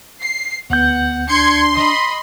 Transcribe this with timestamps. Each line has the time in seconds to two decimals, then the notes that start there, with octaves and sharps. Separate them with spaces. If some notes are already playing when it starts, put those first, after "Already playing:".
0.22 C7
0.70 D2 B3 F#5 G6
1.28 D4 C6 G#6 C#7
1.75 D#5 B5